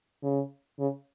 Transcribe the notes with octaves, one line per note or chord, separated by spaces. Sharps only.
C#3
C#3